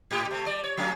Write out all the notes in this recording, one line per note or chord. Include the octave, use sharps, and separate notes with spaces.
G#2 G4
C3 A3
G3 D5
C#5
F3 A3 C#4